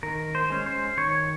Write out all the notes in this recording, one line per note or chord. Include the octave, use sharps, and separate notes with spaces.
D#3 A#4
C5
G#3 C#4
C5
D#3 C#5